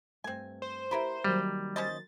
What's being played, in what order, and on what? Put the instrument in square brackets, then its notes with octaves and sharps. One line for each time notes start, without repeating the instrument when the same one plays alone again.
[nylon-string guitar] G2 A3 [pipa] C4 G#5
[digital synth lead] C5
[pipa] E4 A#4 B4 [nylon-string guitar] G4
[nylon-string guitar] D#3 F#3 A#3 [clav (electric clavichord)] G3
[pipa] C#4 C5 D#5 [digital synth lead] A6